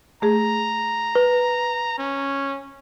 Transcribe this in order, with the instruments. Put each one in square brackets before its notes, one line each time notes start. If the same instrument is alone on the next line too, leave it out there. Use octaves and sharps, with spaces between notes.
[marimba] A3 G#4 [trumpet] A#5
[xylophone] B4
[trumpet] C#4